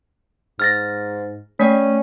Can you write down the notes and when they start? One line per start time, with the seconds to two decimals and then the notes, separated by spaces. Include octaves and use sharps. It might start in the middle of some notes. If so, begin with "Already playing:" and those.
0.59 G#2 F6 A6 A#6
1.60 A3 C#4 D5 G5